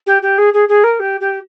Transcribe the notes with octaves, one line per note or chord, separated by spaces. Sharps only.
G4
G4
G#4
G#4
G#4
A#4
G4
G4